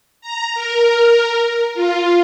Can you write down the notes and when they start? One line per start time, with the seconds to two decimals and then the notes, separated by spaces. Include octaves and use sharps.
0.21 A#5
0.55 A#4
1.74 F4